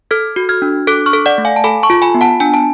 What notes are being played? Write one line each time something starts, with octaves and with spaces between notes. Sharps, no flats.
A4 F6 G#6
F#4
F6 G#6
D4
A4 D6 F#6
C#6 F6
A4
D5 F#5
A3
F5 G#5
A5
A4 G#5 B5
A5 C#6
F4
G#5 B5
B3
F#5 A5
D4 G#5
A5